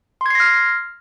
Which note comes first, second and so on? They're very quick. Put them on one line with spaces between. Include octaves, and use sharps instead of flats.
C6 G#6 C7 A#6 F6